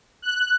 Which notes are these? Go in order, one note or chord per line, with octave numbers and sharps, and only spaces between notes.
F#6